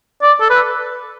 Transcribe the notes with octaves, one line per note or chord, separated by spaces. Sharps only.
D5
A4
B4